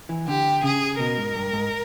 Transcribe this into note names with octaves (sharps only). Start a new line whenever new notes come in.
E3
D3 G4
C#3 G#4
B2 A#4
G#2
G2
G#2